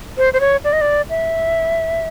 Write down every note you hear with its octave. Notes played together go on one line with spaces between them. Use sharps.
C5
C5
C#5
D5
D#5
D5
E5